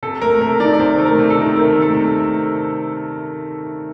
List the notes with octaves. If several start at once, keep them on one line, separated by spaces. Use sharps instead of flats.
C3 A4
A3 A#4
C3 A#4
D#3 D5
D5
C3 C5
A3
A#4
C3
A4
D#3
C3 A#4
A3
A4
C3